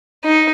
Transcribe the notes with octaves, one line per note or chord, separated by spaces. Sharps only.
D#4